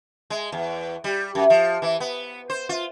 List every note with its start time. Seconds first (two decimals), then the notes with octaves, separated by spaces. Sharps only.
0.30 G#3
0.52 E2
1.04 G3
1.35 F#2
1.50 F3
1.82 E3
2.00 B3
2.50 C5
2.69 F4